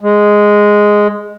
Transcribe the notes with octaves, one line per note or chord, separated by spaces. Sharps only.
G#3